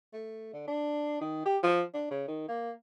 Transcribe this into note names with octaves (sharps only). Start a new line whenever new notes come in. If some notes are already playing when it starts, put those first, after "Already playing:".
A3
D3
D4
D#3
G4
F3
D4
C#3
D#3
A#3